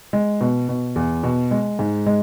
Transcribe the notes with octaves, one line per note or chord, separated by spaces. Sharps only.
G#3
B2
B2
E2
B2
G#3
G#2
G#3